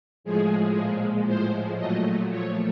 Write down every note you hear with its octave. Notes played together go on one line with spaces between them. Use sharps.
A2 F3 G#3 G#4
A#2 F3 G#3
A2 F3 G#3 C5
A#2 F#3 A3 D#5
A#2 F3 A3 C#5